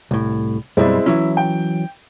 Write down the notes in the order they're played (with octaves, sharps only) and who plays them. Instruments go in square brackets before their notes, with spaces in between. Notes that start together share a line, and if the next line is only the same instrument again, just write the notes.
[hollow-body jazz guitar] C2 A2
[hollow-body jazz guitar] F#2 B2 G3 [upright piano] G#3 C4 E4
[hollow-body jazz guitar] E3 F#3 C#4 [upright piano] E4
[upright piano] G5